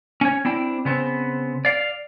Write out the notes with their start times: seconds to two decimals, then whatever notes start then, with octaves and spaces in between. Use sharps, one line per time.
0.21 C#4 C#5
0.45 C4 D4 E4 G5
0.85 C#3 B3 C4
1.65 D5 F5